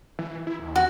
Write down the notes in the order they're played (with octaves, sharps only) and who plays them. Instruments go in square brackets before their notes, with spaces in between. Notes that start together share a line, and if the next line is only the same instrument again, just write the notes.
[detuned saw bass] E3
E4
D#2
[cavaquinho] F#4